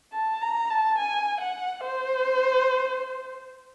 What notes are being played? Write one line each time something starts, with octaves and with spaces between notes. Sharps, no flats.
A5
A#5
A5
G#5
F#5
C5